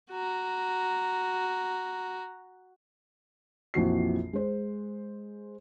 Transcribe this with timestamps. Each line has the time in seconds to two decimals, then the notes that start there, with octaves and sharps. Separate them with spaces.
0.11 F#4 A#5
3.74 A#1 F2 E3 F#4 C7
4.33 G#3 C5